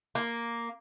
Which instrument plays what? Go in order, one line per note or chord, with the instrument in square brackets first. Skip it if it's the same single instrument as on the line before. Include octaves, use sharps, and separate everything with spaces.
[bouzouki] A#3